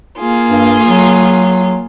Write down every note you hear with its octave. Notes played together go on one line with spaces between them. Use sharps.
A#3 F4 G#4
G2
F#3